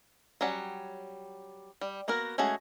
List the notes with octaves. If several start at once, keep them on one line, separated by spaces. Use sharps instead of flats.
F#3 G3 C#4 F#5
G3
A#3 B3 F#4 A#4
G#3 A3 C#4 F#4 G#4